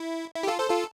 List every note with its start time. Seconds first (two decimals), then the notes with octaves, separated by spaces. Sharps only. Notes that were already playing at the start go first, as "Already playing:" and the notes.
Already playing: E4
0.36 E4
0.43 G4
0.47 F4 A4
0.59 A4 C5
0.70 F4 A4